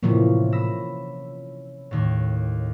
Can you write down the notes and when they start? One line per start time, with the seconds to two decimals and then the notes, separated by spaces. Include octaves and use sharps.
0.03 A2 C3 E3 F3 A#3 C#4
0.52 B5 E6 A#6
1.91 D#2 A2